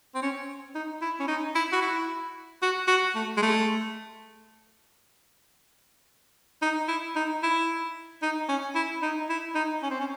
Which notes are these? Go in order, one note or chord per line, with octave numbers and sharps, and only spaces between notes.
C4
C#4
D#4
E4
C#4
D#4
E4
F#4
E4
F#4
F#4
A3
G#3
A3
D#4
E4
D#4
E4
D#4
C#4
E4
D#4
E4
D#4
C#4
C4
C#4